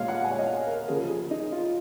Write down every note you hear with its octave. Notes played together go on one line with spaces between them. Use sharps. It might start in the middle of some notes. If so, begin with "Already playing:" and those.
Already playing: A#2 G#3 C#5 F5
F#5
G#5
C#5
D#5
F5
A#4
C#3 F3 A#3 G#4
G#4
D#4
F4